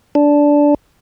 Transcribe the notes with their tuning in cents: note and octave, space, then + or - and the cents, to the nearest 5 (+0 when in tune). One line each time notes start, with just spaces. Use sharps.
D4 -10